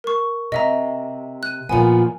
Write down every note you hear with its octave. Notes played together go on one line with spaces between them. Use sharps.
A#4 C#6
C3 D#5 E5 A#5
F#6 D#7
A#2 F3 B3 G#5